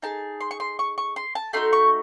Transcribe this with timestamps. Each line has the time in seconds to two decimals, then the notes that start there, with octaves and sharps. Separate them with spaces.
0.02 D#4 G#4 A5
0.41 C6
0.51 C#6
0.60 C6
0.79 C#6
0.98 C#6
1.16 C6
1.35 A5
1.53 A3 D#4 F#4 C6
1.73 C#6